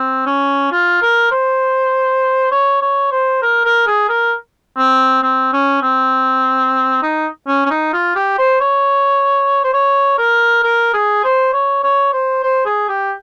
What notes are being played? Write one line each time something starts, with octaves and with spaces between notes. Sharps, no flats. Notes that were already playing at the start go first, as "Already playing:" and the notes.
Already playing: C4
C#4
F4
A#4
C5
C#5
C#5
C5
A#4
A#4
G#4
A#4
C4
C4
C#4
C4
D#4
C#4
C#4
D#4
F4
G4
C5
C#5
C5
C#5
A#4
A#4
G#4
C5
C#5
C#5
C5
C5
G#4
G4